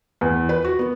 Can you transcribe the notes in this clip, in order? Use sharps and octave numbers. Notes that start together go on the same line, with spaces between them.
E2
B4
F#4
B3